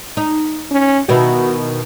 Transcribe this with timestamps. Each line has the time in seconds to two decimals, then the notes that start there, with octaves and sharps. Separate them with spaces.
0.17 D#4
0.71 C#4
1.09 B2 D#3 E4 F#4